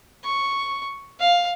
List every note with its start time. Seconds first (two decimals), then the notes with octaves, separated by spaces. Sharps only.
0.25 C#6
1.20 F5